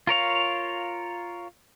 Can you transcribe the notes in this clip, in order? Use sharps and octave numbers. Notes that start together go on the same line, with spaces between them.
F4 A#4 C#5 F5